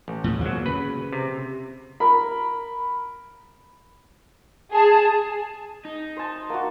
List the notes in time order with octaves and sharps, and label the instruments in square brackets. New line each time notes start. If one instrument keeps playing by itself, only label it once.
[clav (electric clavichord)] A1
[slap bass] D#2 A2
[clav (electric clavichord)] G#1 F#3 [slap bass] A#3
[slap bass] C#3 [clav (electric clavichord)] B4
[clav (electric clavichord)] C3
[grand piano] A#4 B5
[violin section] G#4 [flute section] A5
[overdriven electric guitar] D#4
[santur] C5 A5
A#3 F#4